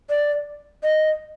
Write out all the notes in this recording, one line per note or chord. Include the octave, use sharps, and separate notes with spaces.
D5
D#5